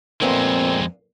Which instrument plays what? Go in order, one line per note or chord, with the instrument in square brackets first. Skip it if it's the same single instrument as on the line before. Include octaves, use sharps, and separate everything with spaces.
[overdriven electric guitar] F2 G#3 [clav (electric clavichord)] A#2 A3 B3 [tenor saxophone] C4